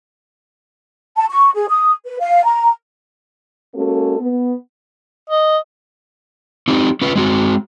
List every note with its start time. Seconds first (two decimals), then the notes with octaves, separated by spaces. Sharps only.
1.17 A5
1.30 C#6
1.54 G#4
1.69 D#6
2.06 B4
2.20 F5
2.45 A#5
3.74 G#3 A#3 C#4 F#4 A4
4.19 B3
5.30 D#5
6.68 C4 D#4 G4
7.02 C#4 F4 B4
7.16 G#3 C4 F#4